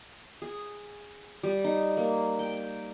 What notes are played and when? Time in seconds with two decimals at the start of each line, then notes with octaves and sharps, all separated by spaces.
0.42 G#4
1.43 G3
1.64 D#4
1.97 A#3
2.39 G5